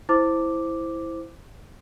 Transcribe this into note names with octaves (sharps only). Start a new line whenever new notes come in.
E4 C5 D6